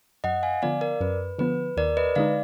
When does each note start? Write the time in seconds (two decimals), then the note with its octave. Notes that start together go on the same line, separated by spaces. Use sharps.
0.24 F#2 D#5 F#5
0.43 F5 G#5
0.62 D3 F3 B3 D5 F5
0.81 A#4 D5
1.00 F#2 B4
1.38 D3 F3 B3 B4
1.77 D#2 A#4 D5
1.97 B4 D#5
2.15 D3 G#3 D#4 D5 F5